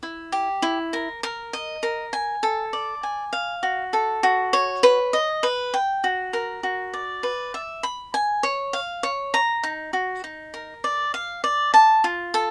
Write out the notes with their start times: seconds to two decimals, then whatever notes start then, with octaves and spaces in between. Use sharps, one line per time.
0.03 E4
0.32 G4
0.62 E4
0.93 A#4
1.23 A#4
1.53 D#5
1.83 A#4
2.13 G#5
2.43 A4
2.73 D5
3.03 G#5
3.33 F5
3.63 F#4
3.93 A4
4.23 F#4
4.53 C#5
4.83 B4
5.13 D#5
5.43 B4
5.74 G5
6.04 F#4
6.33 A#4
6.63 F#4
6.94 D5
7.23 B4
7.54 E5
7.83 B5
8.14 G#5
8.43 C#5
8.73 F5
9.03 C#5
9.34 A#5
9.63 D#4
9.93 F#4
10.24 D#4
10.54 A#4
10.84 D5
11.14 F5
11.44 D5
11.74 A5
12.04 F4
12.34 A4